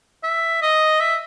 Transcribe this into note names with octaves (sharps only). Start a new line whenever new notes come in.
E5
D#5
E5